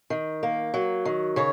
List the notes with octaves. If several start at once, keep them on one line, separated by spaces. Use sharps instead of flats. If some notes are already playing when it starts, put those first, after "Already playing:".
D#3
A#3
F#3
D#3
C#3 C#5